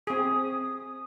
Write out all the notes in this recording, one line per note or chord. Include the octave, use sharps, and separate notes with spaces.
C4 G#4 D#6